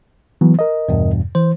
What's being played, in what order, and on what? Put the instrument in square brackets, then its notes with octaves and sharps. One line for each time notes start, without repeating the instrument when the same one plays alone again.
[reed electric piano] E3 F#3 B3
A#4 D#5
[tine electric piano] E2 G2 B2
[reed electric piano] E3 [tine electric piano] C5